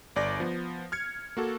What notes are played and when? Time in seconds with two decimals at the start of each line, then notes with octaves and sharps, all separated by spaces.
0.16 G1 D5 D6 A#6
0.40 F3 B3
0.92 F6 G#6 C#7
1.37 A#3 F#4 A4